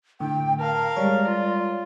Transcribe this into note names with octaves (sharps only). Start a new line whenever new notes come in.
A2 D3 G5
A#4 F5 A5
G3 G#3 C#5 D5
F4